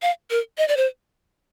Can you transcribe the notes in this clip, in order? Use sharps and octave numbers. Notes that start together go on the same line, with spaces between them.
F5
A#4
D#5
D5
C5